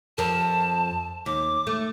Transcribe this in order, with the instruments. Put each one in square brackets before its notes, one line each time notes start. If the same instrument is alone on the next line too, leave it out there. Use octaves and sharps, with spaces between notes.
[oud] F2 A#4 [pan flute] A5
[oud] D#2 [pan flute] D6
[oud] A3